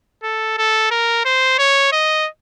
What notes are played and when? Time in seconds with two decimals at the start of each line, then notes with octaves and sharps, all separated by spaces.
0.23 A4
0.58 A4
0.91 A#4
1.25 C5
1.59 C#5
1.92 D#5